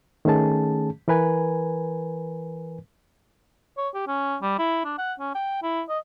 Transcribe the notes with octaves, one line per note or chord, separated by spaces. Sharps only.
D#3 A3 C#4 G#4 A5
E3 A#4 B4 G#5
C#5
G4
C#4
G3
E4
D4
F#5
C#4
G5
E4
D#5